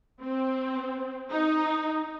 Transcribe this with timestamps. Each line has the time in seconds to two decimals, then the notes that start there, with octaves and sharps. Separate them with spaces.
0.22 C4
1.30 D#4